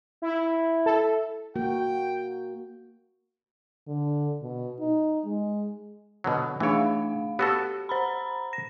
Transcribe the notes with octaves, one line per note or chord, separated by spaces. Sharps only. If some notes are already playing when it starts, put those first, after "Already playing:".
E4
A4
A#3 F#4 A#4 G5
D3
B2
D#4
G#3
B2 D3 F#3
E3 A3 D4 C#5 F5
B3 F#4 G4 A4
C5 A#5 B5
A#6